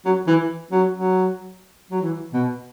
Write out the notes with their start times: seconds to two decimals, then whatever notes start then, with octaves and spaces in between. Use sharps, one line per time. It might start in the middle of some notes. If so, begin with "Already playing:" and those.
0.05 F#3
0.27 E3
0.71 F#3
0.92 F#3
1.90 F#3
2.01 E3
2.33 B2